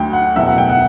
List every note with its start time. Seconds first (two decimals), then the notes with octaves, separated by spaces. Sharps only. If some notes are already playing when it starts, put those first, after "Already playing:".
Already playing: D2 D3 F#3 G5
0.13 F#5
0.36 F#1 E2 B2 E5
0.47 F#5
0.58 G5
0.70 F#5